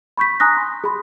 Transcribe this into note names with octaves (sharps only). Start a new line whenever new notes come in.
B5 C#6 G6 B6
G#5 A#5 D#6 F#6 A#6
C6
G#4 B5 C6